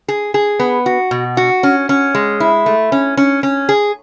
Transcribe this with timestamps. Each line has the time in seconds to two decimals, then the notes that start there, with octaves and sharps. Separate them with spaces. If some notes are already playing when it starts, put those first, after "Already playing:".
0.08 G#4
0.34 G#4
0.60 B3
0.86 F#4
1.11 B2
1.37 F#4
1.63 C#4
1.89 C#4
2.15 G#3
2.40 E4
2.66 A3
2.92 C#4
3.17 C#4
3.43 C#4
3.69 G#4